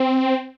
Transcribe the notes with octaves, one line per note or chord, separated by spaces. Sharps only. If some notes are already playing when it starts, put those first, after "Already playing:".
Already playing: C4